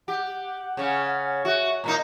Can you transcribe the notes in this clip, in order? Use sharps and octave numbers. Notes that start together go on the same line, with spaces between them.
G4 F#5
C#3 C#4
F#4 E5
A#2 A#3 D#4 A#5